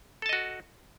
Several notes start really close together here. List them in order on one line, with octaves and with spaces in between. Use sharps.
A4 A5 D#5 F#4